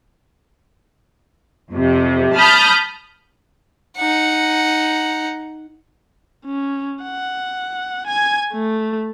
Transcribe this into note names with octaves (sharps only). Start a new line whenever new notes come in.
F2 C3
A5 B5 D#6 F6 G6 A6
D#4 F#5
C#4
F#5
G#5 G#6
A3